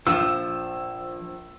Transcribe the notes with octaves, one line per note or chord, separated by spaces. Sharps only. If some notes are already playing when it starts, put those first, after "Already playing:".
A#1 F3 E6